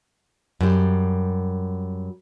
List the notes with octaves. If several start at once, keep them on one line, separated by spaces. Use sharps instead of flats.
F#2 G3